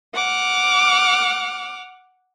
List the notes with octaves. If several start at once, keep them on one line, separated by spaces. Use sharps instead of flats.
F#5 D6 F6